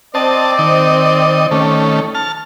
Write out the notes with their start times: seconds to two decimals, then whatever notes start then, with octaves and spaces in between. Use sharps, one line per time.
0.15 C4 D5 D#5 A5
0.59 D#3 D#5
1.51 D#3 A3 C#4
2.15 A5 F6